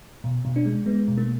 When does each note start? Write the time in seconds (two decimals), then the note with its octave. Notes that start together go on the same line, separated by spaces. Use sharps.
0.24 B2
0.45 B2
0.56 D4
0.66 G#3
0.86 G#3 B3
1.08 B2
1.18 A#3